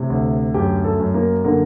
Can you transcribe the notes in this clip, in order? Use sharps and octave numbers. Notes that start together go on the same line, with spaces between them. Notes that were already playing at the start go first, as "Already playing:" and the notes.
Already playing: A2 C3
D2
F#2 G4
A3 A4
F#2
A#3 A#4
D3 A#3 A#4